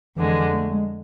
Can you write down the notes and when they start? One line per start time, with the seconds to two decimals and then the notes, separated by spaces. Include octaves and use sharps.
0.16 F2 D3 E3 G#3
0.53 A3
0.72 G#3